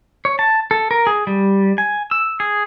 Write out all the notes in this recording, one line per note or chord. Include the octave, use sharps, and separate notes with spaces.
C#5
A5
A4
A#4
G#4
G3
G#5
E6
G#4